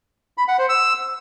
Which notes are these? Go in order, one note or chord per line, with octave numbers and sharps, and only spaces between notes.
B5
F#5
C5
E6